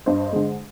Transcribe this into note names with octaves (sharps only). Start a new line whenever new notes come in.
G2 C5 D#5
D3 G#3